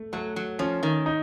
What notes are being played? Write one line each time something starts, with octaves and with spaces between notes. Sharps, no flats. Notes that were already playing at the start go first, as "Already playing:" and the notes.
Already playing: A3
F#3 A3
F#3
F3 C#4
D#3
D#4